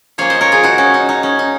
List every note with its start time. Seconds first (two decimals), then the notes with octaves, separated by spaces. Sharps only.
0.18 F3 A#3 C#4 C#5 F5
0.30 C5 D#5
0.41 A#4 C#5
0.52 F4 G#4
0.63 D#4 F#4
0.78 C#4
0.94 D#4
1.09 D#4
1.23 C#4
1.39 D#4